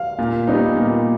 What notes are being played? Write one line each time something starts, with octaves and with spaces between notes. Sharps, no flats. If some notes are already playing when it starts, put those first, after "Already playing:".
Already playing: F5
A#2
G3 B3 D#4
A#2